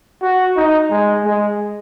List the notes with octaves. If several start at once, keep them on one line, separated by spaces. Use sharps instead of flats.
F#4
D#4
G#3
G#3